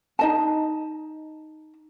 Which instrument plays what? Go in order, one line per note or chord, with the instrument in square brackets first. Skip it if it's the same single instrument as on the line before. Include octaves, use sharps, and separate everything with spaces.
[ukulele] D#4 D#5 A5